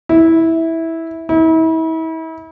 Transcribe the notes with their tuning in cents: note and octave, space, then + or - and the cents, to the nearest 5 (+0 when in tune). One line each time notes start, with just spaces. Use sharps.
E4 -10
E4 -35